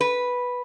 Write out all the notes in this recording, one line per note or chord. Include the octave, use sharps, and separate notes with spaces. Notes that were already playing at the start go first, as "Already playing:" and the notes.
B4